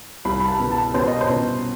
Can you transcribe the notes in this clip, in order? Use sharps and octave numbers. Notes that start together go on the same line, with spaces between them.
C2 B5
B5
A5
B2
A5
B2 C5
D#5
C5
B2